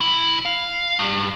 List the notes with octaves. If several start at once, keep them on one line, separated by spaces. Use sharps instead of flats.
B1 E4
F5
G2